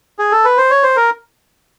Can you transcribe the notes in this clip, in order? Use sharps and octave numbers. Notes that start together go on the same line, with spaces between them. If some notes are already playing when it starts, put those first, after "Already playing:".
G#4
A4
B4
C5
C#5
C5
A#4